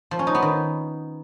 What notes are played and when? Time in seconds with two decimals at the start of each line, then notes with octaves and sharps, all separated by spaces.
0.11 F3
0.19 C#4
0.27 D#4
0.35 B3
0.42 D#3